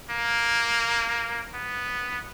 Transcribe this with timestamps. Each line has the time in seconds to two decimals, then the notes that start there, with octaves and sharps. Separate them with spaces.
0.11 A#3
1.54 B3